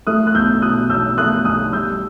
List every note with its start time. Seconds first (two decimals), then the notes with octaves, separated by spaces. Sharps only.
0.07 A3 D#6 F#6
0.27 F#6
0.34 B1 E6 G6
0.62 B2 D#6 F#6
0.89 B1 E6 G6
1.18 A3 D#6 F#6
1.45 B1 D#6 F#6
1.73 G3 E6 G6